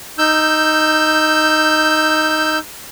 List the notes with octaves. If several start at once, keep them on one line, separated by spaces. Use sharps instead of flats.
D#4 E6 G6